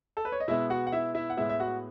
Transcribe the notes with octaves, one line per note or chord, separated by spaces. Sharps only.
A4
B4
C#5
D#5
B2 G#3 B3 E4 E5
F#4 F#5
F#5
E4 E5
E4 E5
F#5
A2 G#3 B3 E4 E5
E5
F#4 F#5